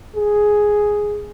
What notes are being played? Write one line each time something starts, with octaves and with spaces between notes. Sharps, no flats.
G#4